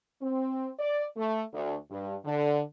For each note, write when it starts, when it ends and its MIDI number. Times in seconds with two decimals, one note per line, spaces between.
0.22 0.71 60
0.79 1.05 74
1.17 1.43 57
1.54 1.76 38
1.91 2.15 43
2.25 2.61 50